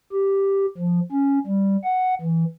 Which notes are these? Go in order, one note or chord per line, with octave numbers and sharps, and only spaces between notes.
G4
F3
C#4
G3
F#5
E3